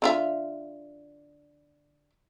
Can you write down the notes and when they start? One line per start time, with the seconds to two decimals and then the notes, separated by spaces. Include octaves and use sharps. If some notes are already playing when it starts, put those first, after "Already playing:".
0.02 D3 F4 E5